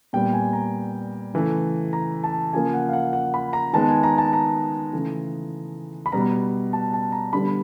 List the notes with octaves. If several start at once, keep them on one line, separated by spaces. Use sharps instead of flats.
A#2 G3 B3 G5
G#5
A#5
C#3 E3 A3
A#5
A5
C#3 F3 A#3 G#5
F#5
F5
F#5
F#5
B5
A#5
D#3 G#3 B3 A5
G#5
A#5
A5
A#5
C#3 E3 A3
B5
B2 G3 B3 A#5
A5
A5
A#5
D3 G3 B3 B5